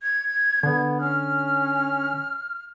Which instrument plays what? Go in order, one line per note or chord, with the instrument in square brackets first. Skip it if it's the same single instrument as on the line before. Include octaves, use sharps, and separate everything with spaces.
[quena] G#6
[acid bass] D3 [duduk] B3
[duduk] C#4 [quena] F6